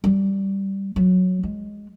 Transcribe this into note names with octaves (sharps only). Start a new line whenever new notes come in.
G3
F#3
G#3